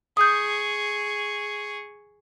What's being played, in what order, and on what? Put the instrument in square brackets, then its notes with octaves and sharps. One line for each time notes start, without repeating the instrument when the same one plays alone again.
[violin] G#4 C#6 [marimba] D#6 G6